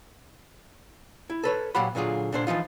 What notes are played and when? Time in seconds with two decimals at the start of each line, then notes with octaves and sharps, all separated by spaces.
1.30 E4
1.44 A4 B4 C#5
1.75 A#2 F#3 G4 F#5 B5
1.95 A#2 D3 F#3 F4 G#4
2.32 A#2 D3 D4 A4 C5
2.47 E3 F3 D#4 F4